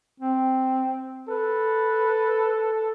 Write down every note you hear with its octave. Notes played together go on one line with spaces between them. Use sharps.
C4
A4 B4